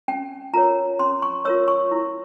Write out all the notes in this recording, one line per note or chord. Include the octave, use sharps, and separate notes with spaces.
C#4 G5
F4 A#4 C#5 A#5
C#4 C6
C#6
F4 A#4 C#5 E6
C#6
E4